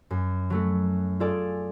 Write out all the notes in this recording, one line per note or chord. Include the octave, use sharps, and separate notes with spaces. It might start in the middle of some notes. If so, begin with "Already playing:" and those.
F#2
F#3 A3 F#4
F4 G#4 A4 D5